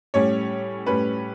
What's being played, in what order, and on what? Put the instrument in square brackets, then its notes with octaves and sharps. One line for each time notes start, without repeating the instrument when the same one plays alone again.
[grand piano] A2 G3 C#4 C#5
A2 G3 C#4 B4